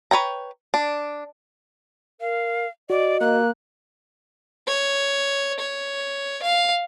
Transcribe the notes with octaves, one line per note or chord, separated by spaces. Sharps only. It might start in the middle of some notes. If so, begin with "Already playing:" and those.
B4 C#5 G5 A#5
D4
A#4 F5
F#4 D5 D#5
A#3 F#6
C#5
C#5
F5